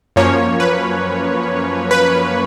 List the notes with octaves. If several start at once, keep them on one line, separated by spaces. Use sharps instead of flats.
F#2 F3 A#3 C#4 C#5
B4
B4